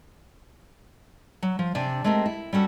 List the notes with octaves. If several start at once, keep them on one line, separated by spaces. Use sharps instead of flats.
F#3
F3
C3 D4 G#5
G#3 A3 C4 G4 A#4
E4
G3 C#4 F#4 A4